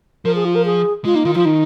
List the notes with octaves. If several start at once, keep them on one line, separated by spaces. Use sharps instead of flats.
F3 A#4
G#4
F4
A#4
G#4
G#3 F4
A#3 D#4
D#3 F4
F3 F4
D#3 D#4